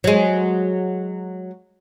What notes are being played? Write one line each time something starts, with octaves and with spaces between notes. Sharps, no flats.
F#3 G#3